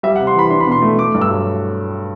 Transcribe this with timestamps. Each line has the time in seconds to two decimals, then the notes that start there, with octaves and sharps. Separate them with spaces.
0.03 G3 E5
0.16 F#5
0.19 C3
0.27 C6
0.35 E3 B5
0.50 D4 C6
0.60 B5
0.67 B2 C6
0.82 A3
0.98 A3 D6
1.14 G2
1.21 E6
1.30 F#3